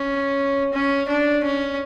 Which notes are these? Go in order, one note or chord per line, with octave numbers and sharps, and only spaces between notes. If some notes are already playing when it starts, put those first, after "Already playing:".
Already playing: C#4
C#4
D4
C#4